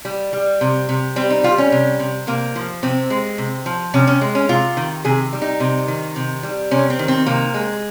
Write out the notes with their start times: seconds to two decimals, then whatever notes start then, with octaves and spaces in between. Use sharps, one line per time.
0.05 G3
0.33 G3
0.61 C3
0.89 C3
1.16 G3 C4
1.30 D#4
1.44 G3 F4
1.58 C#4
1.72 C3
2.00 C3
2.27 C3 A#3
2.55 F3
2.83 C3 C4
3.10 G#3
3.38 C3
3.66 F3
3.94 C3 C#4
4.07 C#4
4.21 G#3
4.35 C#4
4.49 C3 F4
4.77 D#3
5.05 C3 G#4
5.33 G3
5.42 D#4
5.60 C3
5.88 D#3
6.16 C3
6.43 G3
6.71 C3 C#4
6.90 C4
6.99 D#3
7.08 C4
7.26 C3 A#3
7.54 G#3